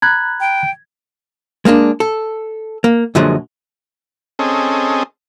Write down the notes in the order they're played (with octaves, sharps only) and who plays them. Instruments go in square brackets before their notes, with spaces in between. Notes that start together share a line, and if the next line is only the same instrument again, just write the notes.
[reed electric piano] A#5 B5 F#6 [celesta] G#6
[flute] G5
[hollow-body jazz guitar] G#3 A#3 C#4 D4
A4
A#3
F#2 A#2 D3 F3 F#3 G#3
[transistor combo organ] C4 C#4 G#4 A4 D#5